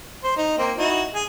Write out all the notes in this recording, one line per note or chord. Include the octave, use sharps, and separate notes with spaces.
C5
D#4
A#3 C4
D#4 E4 F#4
G#4